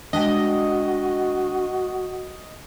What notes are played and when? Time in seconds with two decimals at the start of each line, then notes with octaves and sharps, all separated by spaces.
0.13 G3 G#3 D4 F#4 D#5 G5